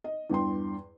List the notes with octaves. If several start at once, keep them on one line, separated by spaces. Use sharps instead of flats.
D#5
E2 G2 G5 C6